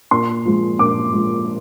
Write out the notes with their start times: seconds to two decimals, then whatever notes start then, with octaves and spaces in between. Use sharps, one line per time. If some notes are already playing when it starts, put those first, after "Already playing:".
0.11 A#2 C6
0.45 F3 G#3
0.79 A#2 D6
1.14 F3 G#3